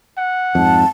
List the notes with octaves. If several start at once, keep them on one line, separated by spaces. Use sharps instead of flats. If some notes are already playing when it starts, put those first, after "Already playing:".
F#5
F2 G#2 A5